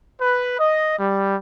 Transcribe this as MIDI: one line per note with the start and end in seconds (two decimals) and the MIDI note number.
0.21 0.58 71
0.59 0.95 75
0.98 1.35 55